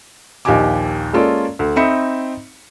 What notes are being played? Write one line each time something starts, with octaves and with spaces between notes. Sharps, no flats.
A#1 D#2 G4 D#5 G#5 D6
G#3 A#3 C#4 F4 A4 D5
D2
C4 D#4 E5 B5 C#7